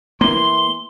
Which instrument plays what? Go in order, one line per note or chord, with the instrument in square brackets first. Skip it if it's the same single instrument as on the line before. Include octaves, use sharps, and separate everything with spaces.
[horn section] E3 C6 [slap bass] A#3 [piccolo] G7